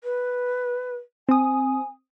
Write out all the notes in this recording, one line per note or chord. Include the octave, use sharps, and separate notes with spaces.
B4
C4 G#5 D#6